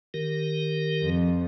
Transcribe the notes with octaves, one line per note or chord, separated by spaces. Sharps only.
D#3 G4 A#4
F2